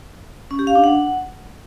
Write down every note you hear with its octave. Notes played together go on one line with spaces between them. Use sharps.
C#4
G4
F5
D4
F#5